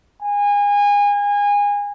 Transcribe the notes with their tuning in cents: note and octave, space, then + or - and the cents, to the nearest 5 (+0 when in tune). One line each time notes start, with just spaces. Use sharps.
G#5 -30